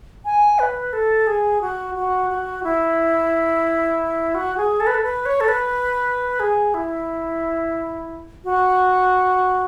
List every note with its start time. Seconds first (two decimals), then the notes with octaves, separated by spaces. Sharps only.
0.25 G#5
0.59 B4
0.93 A4
1.27 G#4
1.61 F#4
1.95 F#4
2.30 F#4
2.64 E4
4.35 F#4
4.57 G#4
4.80 A4
4.87 B4
4.94 A4
5.03 B4
5.26 C#5
5.40 A4
5.48 B4
6.40 G#4
6.74 E4
8.44 F#4